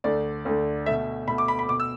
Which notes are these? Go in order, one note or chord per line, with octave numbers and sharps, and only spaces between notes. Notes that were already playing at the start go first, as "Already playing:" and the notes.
D2 D3 A3 D5
D2 D3 A3
B2 A3 E5
B2 A3 B5
D6
B5
B5
B2 A3 D6
E6